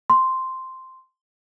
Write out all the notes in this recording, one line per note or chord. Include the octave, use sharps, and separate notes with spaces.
C6